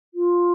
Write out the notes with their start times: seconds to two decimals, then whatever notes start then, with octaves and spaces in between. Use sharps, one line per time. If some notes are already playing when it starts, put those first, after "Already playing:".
0.14 F4